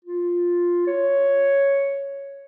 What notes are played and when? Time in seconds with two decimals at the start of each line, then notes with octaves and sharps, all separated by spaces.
0.05 F4
0.87 C#5